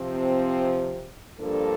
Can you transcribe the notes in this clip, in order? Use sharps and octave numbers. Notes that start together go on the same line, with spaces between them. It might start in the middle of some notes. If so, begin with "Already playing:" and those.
Already playing: C3 F3 C4
G2 F3 A#3 D4 A4